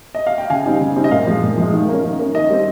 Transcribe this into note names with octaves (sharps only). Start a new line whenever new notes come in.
D#5
F5
G5
C#3 F5 G#5
G3 C4 D#4
C#3
G3 C4 D#4
D#5
A#2 F5
F3 G#3
A#2
F3 G#3
D#3
A#3 C#4
D#3
A#3 C#4
D#3 D#5
G3 C4